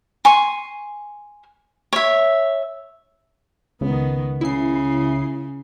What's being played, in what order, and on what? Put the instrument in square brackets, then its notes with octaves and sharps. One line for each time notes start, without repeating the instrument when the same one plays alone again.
[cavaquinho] G#5 C6 C#6
C#5 E5
[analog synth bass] C#2 [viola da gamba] D#3 B3
[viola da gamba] C#3 [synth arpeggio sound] E4 C7